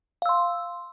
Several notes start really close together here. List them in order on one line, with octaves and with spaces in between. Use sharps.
F5 E6 C6